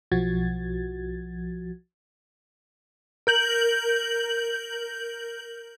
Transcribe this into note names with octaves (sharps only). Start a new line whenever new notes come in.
B1 F3 F#4 G#6 A6
A#4 G6 F#7